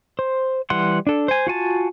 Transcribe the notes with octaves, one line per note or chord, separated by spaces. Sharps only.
C5
E3 G3 F#5 C6
D4 A4
C5 G#5
F4 F#4 G#5 A5